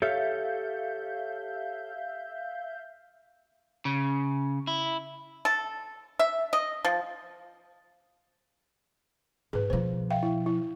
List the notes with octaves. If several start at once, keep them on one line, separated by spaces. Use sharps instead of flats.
G4 A4 C#5 E5 F5 G6
C#3
E4
A4
E5
D#5
F3
G#2 G#4 B4
B2 F3 C5
E5 F5 G5
E4
E4